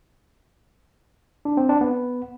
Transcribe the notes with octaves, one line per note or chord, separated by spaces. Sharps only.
D4
C4
D4
B3